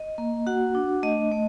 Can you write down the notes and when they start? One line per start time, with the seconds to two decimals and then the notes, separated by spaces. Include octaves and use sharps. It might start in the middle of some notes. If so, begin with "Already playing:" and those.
Already playing: D#5
0.18 A#3
0.47 F#4 F#5
0.75 D4
1.03 A3 D#5
1.32 A3